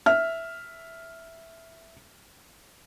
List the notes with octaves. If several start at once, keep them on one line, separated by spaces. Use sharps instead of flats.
E5 F6